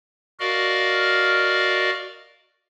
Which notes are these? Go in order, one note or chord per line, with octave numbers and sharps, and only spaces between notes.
F#4 A#4 D5 D#5 F5 F6